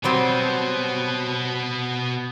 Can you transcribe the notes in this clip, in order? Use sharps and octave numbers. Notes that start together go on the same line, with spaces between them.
B2 F#3 G3 B3 C4